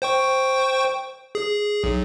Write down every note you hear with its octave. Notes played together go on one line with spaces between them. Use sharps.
C5 G5 C#6
G#4
B1